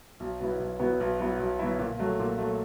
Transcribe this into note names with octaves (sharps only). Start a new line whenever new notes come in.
B1
B2 F#3 B3 E4
B1
B2 F#3 B3 E4
B1
B2 F#3 B3 E4
B1
B2 F#3 B3 E4
A#2
F#3 A3
A#2
F#3 A3